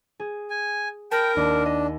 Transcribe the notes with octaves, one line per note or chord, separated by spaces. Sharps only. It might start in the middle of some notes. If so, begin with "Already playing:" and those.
G#4
G#5
A#4 G5 A5 B5
D#2 D4
D#5